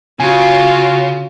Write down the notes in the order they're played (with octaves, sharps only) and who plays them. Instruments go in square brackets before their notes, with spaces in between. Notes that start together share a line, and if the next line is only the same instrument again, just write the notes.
[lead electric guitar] C#3 [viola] F4 F#4 [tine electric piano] G#5